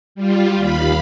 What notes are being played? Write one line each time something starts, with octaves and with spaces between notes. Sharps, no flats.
G3 F4
D#2 F5 B5